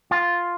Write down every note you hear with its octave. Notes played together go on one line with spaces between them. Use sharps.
F4